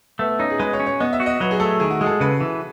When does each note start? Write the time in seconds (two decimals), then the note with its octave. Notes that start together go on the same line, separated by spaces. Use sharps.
0.19 A3 B3
0.29 B3
0.39 C#4 D#4
0.50 G#4
0.59 G#3 B4
0.73 C#5
0.80 C#4
0.86 C#5
1.00 B3 D#5
1.13 E5
1.20 F#4
1.26 D#5
1.40 F#3 B4
1.51 G#4
1.60 A3 A4
1.80 D#3 G#4
1.91 F#4
2.01 G#3 G#4
2.06 A4
2.11 G#4
2.20 C#3 B4
2.41 E3